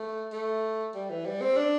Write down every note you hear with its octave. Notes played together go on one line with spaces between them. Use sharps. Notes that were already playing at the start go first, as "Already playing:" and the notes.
Already playing: A3
A3
G3
E3
G3
C4
D4